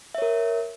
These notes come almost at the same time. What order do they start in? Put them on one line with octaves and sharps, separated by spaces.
E5 C#5 A#4